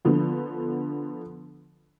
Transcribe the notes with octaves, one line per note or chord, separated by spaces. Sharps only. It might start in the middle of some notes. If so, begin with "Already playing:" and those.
D3 F3 B3